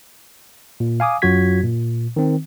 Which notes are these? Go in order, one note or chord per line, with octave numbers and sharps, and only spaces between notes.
A#2
F5 G#5 D6 D#6
F#2 F#3 F4 F#4 G#6 B6
A#2
D#3 C4